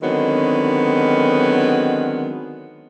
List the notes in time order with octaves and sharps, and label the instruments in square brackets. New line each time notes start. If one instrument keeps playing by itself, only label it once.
[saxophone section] D3 D#3 F#3 G#3 B3 C4